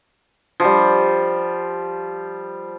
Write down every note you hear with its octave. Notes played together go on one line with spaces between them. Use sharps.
F3 G3